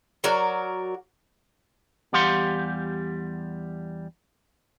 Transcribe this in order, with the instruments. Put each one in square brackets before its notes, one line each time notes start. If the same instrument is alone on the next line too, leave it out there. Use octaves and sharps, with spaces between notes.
[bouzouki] F#3 F#4 A#4 D5
[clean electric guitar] E2 G3 G4 F5 F#5 C6